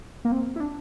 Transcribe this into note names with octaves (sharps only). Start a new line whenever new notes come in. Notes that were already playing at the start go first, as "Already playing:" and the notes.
A#3
C4
E4
D4